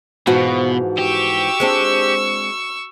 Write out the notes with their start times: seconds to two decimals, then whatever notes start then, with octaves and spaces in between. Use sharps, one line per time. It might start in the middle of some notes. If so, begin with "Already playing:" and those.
0.27 G#2 B2 E3 F3 F#4
0.99 G4 C#6 E6
1.60 G#3 C4 D4